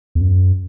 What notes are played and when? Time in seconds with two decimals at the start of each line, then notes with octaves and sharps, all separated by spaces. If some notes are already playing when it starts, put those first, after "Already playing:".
0.15 E2
0.21 F#2